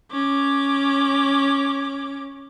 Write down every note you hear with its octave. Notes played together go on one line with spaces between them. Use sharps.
C#4 D6